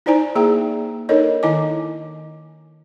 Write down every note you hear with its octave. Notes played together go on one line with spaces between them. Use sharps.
D#4 E4 C5 D5 G#5 A#5
A#3 G#4 G5 A#5
D4 D#4 A4 A#4 C#5 D#5
D#3 E4 D#5 G#5 D6